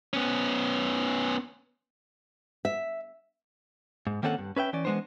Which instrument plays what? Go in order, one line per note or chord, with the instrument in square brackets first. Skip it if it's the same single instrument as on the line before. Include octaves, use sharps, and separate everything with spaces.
[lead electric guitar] B3 C#4
[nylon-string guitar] E5
[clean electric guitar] G#2
D#3 A#3 C4 C#4 A4 F#5
G2
C#4 B4 E5 G5
E3 C#4 D5
E3 G#3 A3 B3 D4 C5